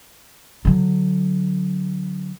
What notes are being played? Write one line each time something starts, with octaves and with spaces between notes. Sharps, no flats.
D3 F#3